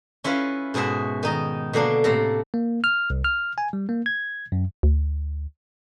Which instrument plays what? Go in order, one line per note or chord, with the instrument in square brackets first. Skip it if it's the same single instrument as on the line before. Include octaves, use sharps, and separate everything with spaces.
[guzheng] C#4 E4 F4 B4 F5
G#2 B2 F#4 G#4 E5
D#3 D#4 D#5
B2 D3 A#3 D4
A2 C3 A#3 A4 A#5
[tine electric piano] A#3
F6
C2
F6
G#5
G3
A#3
G#6
F#2
[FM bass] D2